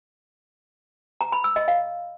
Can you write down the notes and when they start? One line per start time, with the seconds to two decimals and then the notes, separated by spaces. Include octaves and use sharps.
1.21 A#5
1.32 B5
1.44 E6
1.56 D#5
1.68 F5